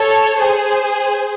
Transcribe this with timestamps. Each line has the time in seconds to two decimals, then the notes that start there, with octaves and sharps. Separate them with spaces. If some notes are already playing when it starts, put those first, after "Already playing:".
Already playing: A4 C#5
0.39 G#4 C5